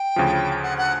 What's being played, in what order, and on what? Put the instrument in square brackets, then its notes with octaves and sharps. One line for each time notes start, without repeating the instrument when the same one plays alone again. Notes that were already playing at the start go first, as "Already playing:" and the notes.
Already playing: [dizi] G5
[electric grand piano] D2 C#3 F3
[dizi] F#5
F#5